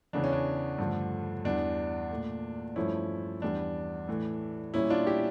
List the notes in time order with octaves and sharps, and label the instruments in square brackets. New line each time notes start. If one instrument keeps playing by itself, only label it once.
[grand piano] E2 C#3 E3 D4
C#4
D4
G2 D3 F3 A3
E2 E3 G3 D4
A#2 A3
G2 F3 A3 C#4 E4
E2 E3 G3 D4
A2 E3 A3
A#2 G3 C#4 E4
D4 F4
E4 G4